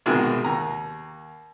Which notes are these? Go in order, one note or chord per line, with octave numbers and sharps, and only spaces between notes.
C2 G#2 B2 D#3 G#3
D#2 A#5